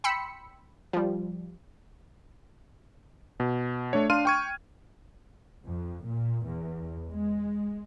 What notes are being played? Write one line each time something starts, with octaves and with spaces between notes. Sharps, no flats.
G5 B5 C6 E6 B6 C#7
F3 G3
B2
A3 D4 C#5
D4 F5 C6 F6 D#7
G5 C#6 G#6
F2
A#2
E2
G#3